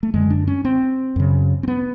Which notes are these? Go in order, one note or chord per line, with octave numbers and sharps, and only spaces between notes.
A3
F#2 D3 G#3
D4
C#4
C4
F#2 C#3
C4
B3